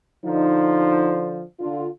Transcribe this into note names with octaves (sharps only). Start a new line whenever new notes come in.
D3 F3 D#4
D3 F4